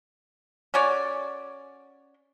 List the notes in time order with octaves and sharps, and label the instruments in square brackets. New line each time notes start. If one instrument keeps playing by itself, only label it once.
[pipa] C#4 F#4 C#5 D5